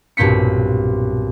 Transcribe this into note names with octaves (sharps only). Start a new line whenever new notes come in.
B1 G2 A#2 C4 B6 C#7